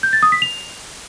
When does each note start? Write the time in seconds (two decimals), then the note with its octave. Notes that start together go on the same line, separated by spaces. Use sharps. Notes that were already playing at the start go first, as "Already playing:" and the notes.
0.03 G6
0.13 A6
0.23 D#6
0.32 B6
0.42 F7